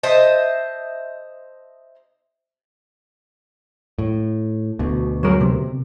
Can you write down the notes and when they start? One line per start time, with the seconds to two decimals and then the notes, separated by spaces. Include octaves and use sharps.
0.03 C5 D#5 E5 A5
3.99 A2
4.79 D2 B2
5.23 F#3 G#3 A#4
5.41 C3